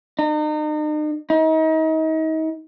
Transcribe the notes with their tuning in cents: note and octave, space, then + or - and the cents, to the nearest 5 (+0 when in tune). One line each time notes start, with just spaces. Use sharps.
D#4 -40
D#4 +35